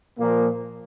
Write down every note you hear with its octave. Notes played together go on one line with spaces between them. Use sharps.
A#2 F3 A#3